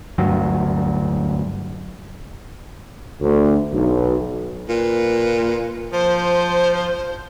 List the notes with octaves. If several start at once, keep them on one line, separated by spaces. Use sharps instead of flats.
D2 G2 F#3
D2
B1
A#2 B4
F3 C5